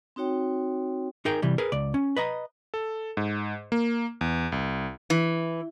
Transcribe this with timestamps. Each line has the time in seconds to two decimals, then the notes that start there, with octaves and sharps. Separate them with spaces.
0.16 C4 D#4 F#4 C#5 G5
1.25 D#4 G#4 A#4 G5
1.42 C3 E3 G3
1.58 G#4 A#4 B4
1.72 C#2 D5
1.94 C#4
2.17 B4 D#5 A#5
2.74 A4
3.17 G#2
3.72 A#3
4.21 E2
4.52 C2
5.10 E3